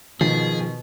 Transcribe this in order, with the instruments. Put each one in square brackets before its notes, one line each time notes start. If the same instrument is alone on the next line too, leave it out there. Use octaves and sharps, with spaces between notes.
[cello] B2 [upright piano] D#3 [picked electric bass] F3 [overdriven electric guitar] G#4